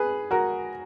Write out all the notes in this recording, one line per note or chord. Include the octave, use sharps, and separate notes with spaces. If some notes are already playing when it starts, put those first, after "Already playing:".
Already playing: G#4 B4
F#4 A#4